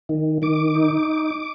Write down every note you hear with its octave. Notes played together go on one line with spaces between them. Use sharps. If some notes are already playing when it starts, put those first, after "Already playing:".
D#3
D#3 D6
D#4